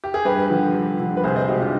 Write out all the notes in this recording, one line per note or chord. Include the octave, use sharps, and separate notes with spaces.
G4
G#4
G2 G4 B4
D3 F3
G2
D3 F3
B4
C2 G#4 C5
C5 D#5
B2 G#3 D#4 G4
D4 F4